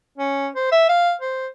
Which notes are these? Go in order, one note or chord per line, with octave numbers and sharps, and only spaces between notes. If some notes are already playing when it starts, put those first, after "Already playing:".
C#4
C5
E5
F5
C5